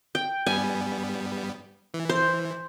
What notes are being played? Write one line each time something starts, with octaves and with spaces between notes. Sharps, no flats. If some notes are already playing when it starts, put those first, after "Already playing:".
G5
G2 G3 B3 G#5
E3
C5